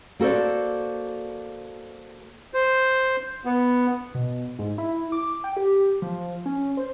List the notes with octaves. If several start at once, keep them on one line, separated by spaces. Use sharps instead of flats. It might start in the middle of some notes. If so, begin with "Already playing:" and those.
A#3 F#4 A4 C5 D5
C5
B3
B2
G#2
E4
D6
G5
G4
F3
C#4
C5